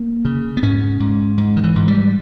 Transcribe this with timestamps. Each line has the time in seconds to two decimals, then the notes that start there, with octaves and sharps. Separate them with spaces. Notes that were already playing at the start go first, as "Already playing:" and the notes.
Already playing: A#3
0.25 C#3
0.57 B3
0.62 G#2 C#4
1.00 G#2
1.38 G#2
1.57 D#3
1.63 E3
1.76 G#2
1.88 G3